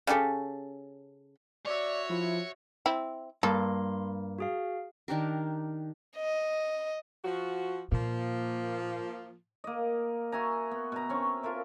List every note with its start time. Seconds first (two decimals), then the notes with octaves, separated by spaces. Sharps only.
0.07 C#3 C#4 G4 A4
1.66 F#4 C#5 D5 E5
2.09 F3 E4
2.86 C4 E4
3.43 G2 A#3 A4 C6
4.39 F#4 G#4 F5
5.08 D#3 D4 G4 A#4
6.17 D#5
7.25 F3 F#4
7.92 A#2 F3 A#3
9.64 A#3 D#5
10.32 F#4 E5 G#5 A#5
10.71 B3
10.92 B2 A#5
11.09 C4 C#4 C#6
11.43 F4 A4 A#4 E5